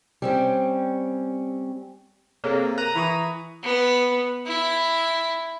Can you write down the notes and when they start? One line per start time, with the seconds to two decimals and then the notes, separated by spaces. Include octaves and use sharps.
0.22 G3 C4 C#4
2.44 C3 A#3 G#4 A4 C#5
2.78 A#4 A#5 F#6 D#7
2.95 E3 B5 C#6 D#6
3.63 B3
4.46 E4